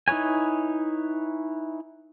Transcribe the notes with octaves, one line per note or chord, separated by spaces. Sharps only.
D#4 E4 B4 C#5 G#5